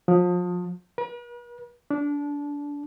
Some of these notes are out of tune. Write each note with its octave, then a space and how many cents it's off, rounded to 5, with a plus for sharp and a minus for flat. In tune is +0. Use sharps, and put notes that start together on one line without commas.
F3 +30
B4 -45
D4 -25